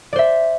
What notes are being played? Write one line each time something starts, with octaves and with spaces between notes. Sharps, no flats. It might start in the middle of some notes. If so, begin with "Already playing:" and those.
C5 D5 E5